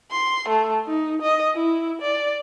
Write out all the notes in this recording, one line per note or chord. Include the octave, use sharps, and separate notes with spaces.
C6
A3
D#4
D#5
E4
D5